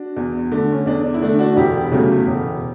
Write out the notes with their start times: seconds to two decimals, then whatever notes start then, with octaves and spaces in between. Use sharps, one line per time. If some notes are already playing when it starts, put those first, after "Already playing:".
Already playing: D4 F#4
0.16 E2
0.52 D3 A3
0.72 C#4
0.86 E2 D4
1.04 D4
1.14 E4
1.21 D3 A3 D4
1.39 D4 F#4
1.56 E1 E4 G4
1.92 E2 C#3 F#3 A3
2.27 E1